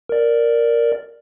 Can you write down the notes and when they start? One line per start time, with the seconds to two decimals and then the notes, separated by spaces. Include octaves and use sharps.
0.09 A#4 D5